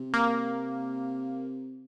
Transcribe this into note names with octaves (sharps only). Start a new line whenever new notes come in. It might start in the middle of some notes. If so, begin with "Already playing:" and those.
Already playing: C3
A#3